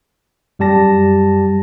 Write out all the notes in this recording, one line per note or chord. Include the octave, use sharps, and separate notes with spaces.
F#2 G3 G4 A5 A#6